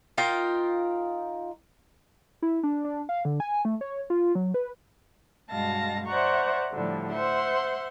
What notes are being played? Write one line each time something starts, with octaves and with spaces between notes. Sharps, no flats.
D#4 F4 A#4 G5
E4
D4
D4
F5
D3
G#5
A3
C#5
F4
F#3
B4
G2 B2 G#3 F5 A5 A#6
C5 D5 E5 F#5 A#5 C#6
A2 D3 F3 G3
C5 E5 F#5 C6